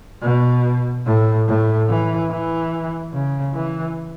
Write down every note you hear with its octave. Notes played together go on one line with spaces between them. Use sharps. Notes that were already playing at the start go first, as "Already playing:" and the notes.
B2
A2
A2
E3
E3
C#3
E3